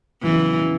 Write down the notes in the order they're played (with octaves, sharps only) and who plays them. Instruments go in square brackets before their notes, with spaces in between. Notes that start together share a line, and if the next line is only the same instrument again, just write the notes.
[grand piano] E2 C#3 F#3 [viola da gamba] E3
[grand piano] C#3 F#3